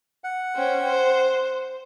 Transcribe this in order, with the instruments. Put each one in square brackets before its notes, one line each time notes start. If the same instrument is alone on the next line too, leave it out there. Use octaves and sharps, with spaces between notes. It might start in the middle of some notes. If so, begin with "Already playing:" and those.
[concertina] F#5
[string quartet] C#4 C5 G5
C5